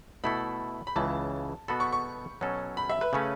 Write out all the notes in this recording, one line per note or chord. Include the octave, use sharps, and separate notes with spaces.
B2 A3 E4 A4 B5
B5
C#2 C#3 E3 A5
B2 B3 F#4 A4 B5
C#6
C#6
B2 F#3 C#4 A4
B5
E5
B4
C#3 A3 C#4